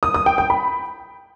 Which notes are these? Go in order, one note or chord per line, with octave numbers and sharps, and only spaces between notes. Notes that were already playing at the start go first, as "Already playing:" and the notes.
D#6
D#6
G5
G5
B5